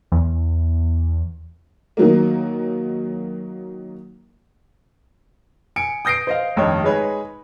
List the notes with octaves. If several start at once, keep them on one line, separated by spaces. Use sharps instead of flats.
E2
D#3 F#3 A#3
G#5 C#7 D7
D#6 G6 A#6 C7 D7
C5 D#5 F5
F1 G2 D#3 C#5
G#3 D#4 G#4 B4 C#5